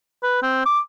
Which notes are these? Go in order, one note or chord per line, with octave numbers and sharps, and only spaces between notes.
B4
C4
D6